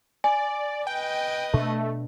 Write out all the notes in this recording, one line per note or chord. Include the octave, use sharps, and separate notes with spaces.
D5 G#5
B4 D#5 G5
B2 A3 D4